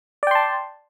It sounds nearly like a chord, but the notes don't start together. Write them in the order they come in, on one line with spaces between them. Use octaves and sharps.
D5 G5 C6 A5